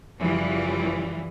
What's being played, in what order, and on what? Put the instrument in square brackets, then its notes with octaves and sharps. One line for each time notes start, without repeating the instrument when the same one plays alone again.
[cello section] F#2 C#3 E3 F3 G3